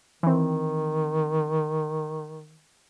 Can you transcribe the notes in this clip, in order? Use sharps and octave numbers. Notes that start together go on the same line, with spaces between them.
D#3 E3 C4